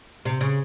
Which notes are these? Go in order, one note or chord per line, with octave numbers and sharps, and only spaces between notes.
C3
C#3